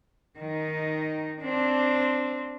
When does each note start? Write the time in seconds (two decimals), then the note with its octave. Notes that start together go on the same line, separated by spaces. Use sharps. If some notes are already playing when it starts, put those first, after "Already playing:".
0.39 D#3 D#4
1.41 C4 D4